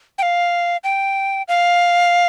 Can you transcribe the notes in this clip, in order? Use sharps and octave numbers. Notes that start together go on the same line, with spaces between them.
G5
F5
G5
F5